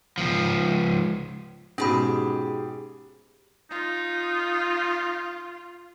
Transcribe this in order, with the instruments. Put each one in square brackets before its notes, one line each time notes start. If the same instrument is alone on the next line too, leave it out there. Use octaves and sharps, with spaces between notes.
[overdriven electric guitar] C#2 F3
[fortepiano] G#2 B2 [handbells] C#4 B5 [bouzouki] G4 G#4
[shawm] D#4 [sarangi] F4